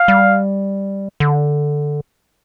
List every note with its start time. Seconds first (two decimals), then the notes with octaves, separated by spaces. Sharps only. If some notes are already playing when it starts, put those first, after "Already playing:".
Already playing: F5
0.08 G3
1.20 D3